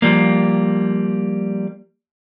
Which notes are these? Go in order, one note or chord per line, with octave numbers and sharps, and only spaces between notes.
F3 G3 A#3